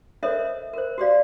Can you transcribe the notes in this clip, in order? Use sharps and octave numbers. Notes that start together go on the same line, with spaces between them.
A4 A#4 C5 C#5 D#5 E5
A#4 C5
F#4 G4 D5 F5